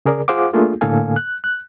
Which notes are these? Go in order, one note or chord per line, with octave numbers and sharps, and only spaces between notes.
C#3 G#4 A#4 D5
F4 G#4 C5 F5 F#5 D6
A3 A#3 D4 F4 G#4 A4
A2 D3 A#3 A4 F5 G#5
F#6
F#6